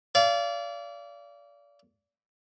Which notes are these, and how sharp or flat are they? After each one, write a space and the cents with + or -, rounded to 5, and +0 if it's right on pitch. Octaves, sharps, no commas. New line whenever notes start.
D5 -30 F5 -30